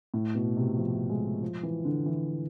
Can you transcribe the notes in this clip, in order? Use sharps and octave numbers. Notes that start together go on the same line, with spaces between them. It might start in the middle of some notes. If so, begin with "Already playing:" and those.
A2
B2
C3
F3
G#3
F3
E3
D3
E3